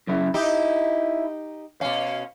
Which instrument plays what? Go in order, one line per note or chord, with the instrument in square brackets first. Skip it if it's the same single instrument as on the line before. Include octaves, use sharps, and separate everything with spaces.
[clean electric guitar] F#2 C#3 E4
[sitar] D#4 G4 [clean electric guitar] E4
[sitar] B2 C#4 [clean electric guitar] F5